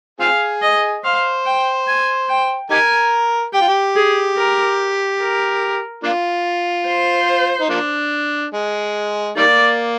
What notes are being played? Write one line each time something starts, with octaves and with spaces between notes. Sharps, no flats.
C4 F4 G#4 F5
D#5
C5 F5
G5
G#5
G5
D#4 G4 A#4 G#5
G4 G5
F4
G4
G#4
A#4
A#4
A#3 D4 F4
C5
D#4
F3 A#3 D4
G#3
D#3 G3 A#3 D5